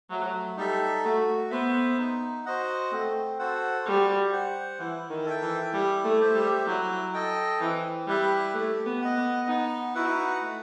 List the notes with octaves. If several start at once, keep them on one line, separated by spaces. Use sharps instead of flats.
F#3 A3
G3 D#4 A4 E5
A3 F#4
B3 C5 E5
D#4
F#4 C5 D#5 F#5
A3 C4
F#4 A4 C5 F#5
G3 F#4
C5 F#5
E3 E4
D#3
A4 E5 G5
E3
G3 E4
A3
G4 C5 E5
G3
F#3 E4
A4 D#5 G5
E3 C4
G3 E4 B4 E5
A3 G4
B3
D#5 F#5
B3
B3 D#4
D#4 E4 F#4 B4 F#5
A3